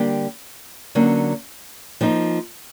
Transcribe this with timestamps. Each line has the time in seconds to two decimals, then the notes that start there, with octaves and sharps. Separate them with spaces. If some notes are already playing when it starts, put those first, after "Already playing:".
Already playing: D3 G3 A#3 D4 G4
0.95 D3 F#3 A#3 C#4
2.01 F3 A#3 D#4